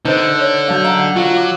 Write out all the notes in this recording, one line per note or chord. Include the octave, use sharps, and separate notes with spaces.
D3 D#4 B4 C5 D#5 A5 G6
C#5
F#3 D4 F5 A5 G6
D#5 F5 F#5 A#5
F#3 F4
D6